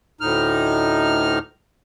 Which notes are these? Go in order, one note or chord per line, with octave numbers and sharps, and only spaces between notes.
D2 A2 D#4 F6